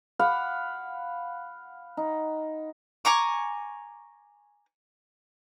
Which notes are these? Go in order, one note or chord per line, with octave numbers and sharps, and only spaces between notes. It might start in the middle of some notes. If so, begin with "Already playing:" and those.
F5 F#5 B5 D6
D#4
G#5 A#5 C#6 D6